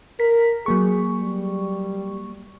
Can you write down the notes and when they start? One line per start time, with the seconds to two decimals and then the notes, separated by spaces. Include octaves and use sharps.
0.20 A#4 B6
0.66 F#3 A#3 G#4 C#6
1.20 G3